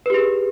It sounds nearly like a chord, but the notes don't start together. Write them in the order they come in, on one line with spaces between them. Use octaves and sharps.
B4 G4 G#4